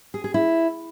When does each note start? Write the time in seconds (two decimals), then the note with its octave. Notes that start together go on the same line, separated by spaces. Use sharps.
0.14 G#4
0.24 G#4
0.34 E4